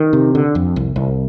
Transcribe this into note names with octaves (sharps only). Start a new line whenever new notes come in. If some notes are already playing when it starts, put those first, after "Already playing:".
Already playing: D#3
C3
D3
F2
C2
C2